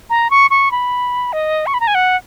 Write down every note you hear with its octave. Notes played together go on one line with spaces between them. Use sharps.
A#5
C#6
C#6
B5
D#5
C#6
B5
A#5
G#5
F#5